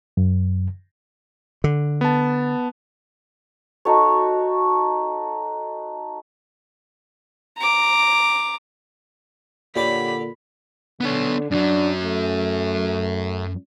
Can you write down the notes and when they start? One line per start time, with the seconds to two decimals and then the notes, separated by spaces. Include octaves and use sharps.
0.17 F#2
1.64 D3
2.01 B3 A5
3.85 D#4 F#4 A4 C#5
7.58 A#5 D6
9.76 A#2 D3 G4 C#5 D5 B5 D6
11.01 D3 B3 C#5
11.51 F#2 F#3 D4
12.03 A3